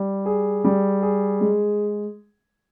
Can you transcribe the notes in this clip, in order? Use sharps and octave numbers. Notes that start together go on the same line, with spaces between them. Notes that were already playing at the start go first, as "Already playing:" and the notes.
Already playing: G3
G#4
G3
G#4
G#3